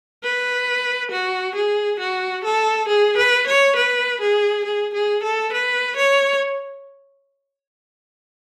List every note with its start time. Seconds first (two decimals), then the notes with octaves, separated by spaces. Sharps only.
0.24 B4
1.11 F#4
1.55 G#4
2.00 F#4
2.45 A4
2.88 G#4
3.17 B4
3.47 C#5
3.76 B4
4.21 G#4
4.65 G#4
4.94 G#4
5.24 A4
5.53 B4
5.97 C#5